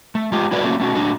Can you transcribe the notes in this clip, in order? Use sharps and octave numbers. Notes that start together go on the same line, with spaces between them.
A3
G#3 F4 G4
E4 F#4 A4 B4 D5
A3 A#3 C#4 F#4
A3 C#4 F#4
A2 G3 D4 F#4 A4